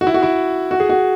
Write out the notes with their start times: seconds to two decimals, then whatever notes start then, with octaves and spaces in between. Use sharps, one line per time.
0.01 F#4
0.07 E4
0.14 F#4
0.23 E4
0.71 F#4
0.80 G#4
0.90 F#4